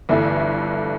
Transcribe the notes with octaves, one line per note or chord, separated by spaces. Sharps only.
G1 G2 E3 A3 E4